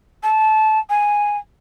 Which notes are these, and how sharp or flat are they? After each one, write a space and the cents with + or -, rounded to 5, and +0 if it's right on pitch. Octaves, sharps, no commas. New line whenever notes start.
A5 -20
G#5 -5